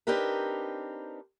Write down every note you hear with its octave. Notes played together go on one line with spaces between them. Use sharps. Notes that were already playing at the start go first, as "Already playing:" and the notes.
C4 D4 D#4 G4 A#4 B4